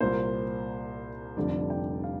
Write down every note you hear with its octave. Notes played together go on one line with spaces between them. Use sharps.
C2 A#2 A#3 C5
F1 F2 D3 G3 D5
G5
F5